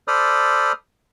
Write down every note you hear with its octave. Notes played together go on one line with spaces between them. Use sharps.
A4 C5 D5 B5 D#6 F6